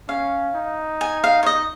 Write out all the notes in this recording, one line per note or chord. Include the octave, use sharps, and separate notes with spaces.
C#4 F5
D#4
G#5
F5
C#5
D#5